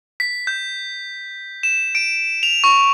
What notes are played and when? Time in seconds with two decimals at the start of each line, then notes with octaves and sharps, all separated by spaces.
0.20 B6
0.47 G6
1.63 E7
1.95 D7
2.43 F7
2.64 C#6